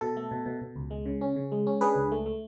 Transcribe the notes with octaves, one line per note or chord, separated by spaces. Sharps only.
B2 A4
A3
B2
B2
B2
C#2
G#3
C#3
C#4
C#3
G#3
C#4
D4 G#4 B4
C#2
A3
A3